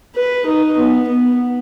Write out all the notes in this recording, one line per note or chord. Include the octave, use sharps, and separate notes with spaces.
B4
D#4
B3
B3